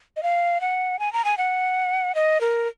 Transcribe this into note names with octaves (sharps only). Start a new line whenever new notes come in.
D#5
F5
F#5
G#5
A#5
G#5
F#5
D#5
A#4